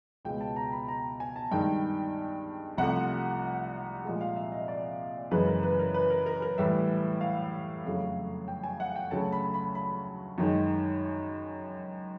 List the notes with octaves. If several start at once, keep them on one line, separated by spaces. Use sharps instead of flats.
C#2 B2 G#3 G5
A5
A#5
B5
A#5
G#5
A5
G2 D#3 G#3 G5
C2 C3 F3 A3 F#5
A#2 F3 G#3
F5
E5
D#5
D5
F#2 C#3 E3 G#3 B4
A#4
B4
A#4
B4
A#4
A#4
A#4
A2 E3 G3 E5
F5
F2 C#3 F#3 A3
G5
G#5
F#5
G5
D2 C#3 F#3 A3 A5
B5
B5
B5
F#2 D#3 G#3